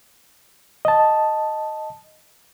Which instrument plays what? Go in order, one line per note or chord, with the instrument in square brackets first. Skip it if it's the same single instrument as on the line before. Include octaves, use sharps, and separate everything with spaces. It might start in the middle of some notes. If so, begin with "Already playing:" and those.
[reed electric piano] D#5 A5